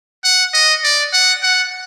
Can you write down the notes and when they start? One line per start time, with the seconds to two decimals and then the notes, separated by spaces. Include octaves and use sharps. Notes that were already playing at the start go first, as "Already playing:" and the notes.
0.24 F#5
0.54 D#5
0.84 D5
1.13 F#5
1.42 F#5